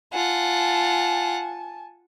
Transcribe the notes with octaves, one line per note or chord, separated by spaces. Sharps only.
F4 F#5 G#5 A5